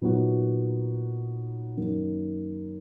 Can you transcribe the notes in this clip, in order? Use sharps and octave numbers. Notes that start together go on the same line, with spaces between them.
A#2 F#3 B3 D#4 F#4
F#2 D#3 A#3 D#4